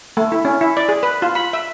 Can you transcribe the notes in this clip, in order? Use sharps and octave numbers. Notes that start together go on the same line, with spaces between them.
A3
E4
C#4
E4
D5
G#4
B4
F4
B5
E5